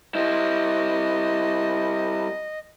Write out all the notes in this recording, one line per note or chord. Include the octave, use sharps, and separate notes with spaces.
G3 E4 D#5